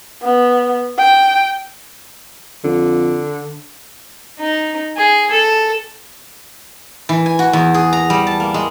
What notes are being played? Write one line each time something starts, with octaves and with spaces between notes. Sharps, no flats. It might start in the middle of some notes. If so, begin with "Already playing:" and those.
B3
G5
F2 D3
D#4
G#4
A4
E3
G#5
F#4
E2
G#4
A#5
G3
A5
A#3
G#3